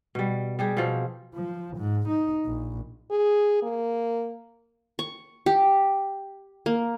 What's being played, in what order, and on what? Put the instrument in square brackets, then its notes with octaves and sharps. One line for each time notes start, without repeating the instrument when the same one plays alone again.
[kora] B2 G3
G3 G4 G#4
B2 F3 C4
[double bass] F3
G#2
D#4
A#1
[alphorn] G#4
A#3
[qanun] C#6
G4
A#3